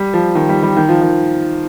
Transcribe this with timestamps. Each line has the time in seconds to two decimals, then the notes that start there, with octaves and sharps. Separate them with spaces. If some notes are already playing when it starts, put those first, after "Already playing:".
Already playing: G3
0.14 F3
0.35 D#3
0.49 G3
0.63 G3
0.77 D#3
0.89 F3
1.01 D#3